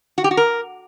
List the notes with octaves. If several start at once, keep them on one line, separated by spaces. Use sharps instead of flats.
F#4
G4
F#4
A#4